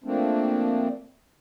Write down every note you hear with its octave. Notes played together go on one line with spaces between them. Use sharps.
F3 A3 A#3 C4 D4